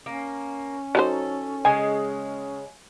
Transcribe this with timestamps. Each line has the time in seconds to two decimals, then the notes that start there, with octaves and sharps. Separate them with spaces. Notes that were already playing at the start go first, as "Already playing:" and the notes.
0.06 A#3 C#4
0.95 F#3 D#4 A4 C5
1.65 C#3 G#3 G#5